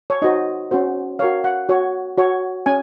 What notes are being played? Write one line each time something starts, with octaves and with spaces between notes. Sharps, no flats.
C#5
D#4 F#4 C5 D#5
C#4 F#4 C5
F#4 A#4 C#5 F5
F#5
F#4 C#5
F#4 C#5
C#4 G#5